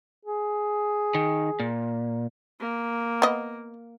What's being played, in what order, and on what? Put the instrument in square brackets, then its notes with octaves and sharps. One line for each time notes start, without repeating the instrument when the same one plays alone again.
[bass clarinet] G#4
[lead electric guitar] D#3
A#2
[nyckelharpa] A#3
[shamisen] B3 D#5